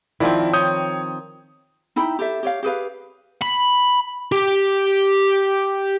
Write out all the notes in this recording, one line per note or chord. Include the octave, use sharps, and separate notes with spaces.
D#3 F3 C4 E4 D5
C#5 D#6 G6
D#4 E4 G5 B5
G4 A4 E5
G4 C#5 F5
G4 G#4 B4 F5
B5
G4